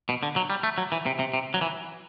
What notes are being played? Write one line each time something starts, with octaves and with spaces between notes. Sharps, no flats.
B2
D3
F#3
G3
A3
F#3
E3
C3
C3
C3
F#3
E3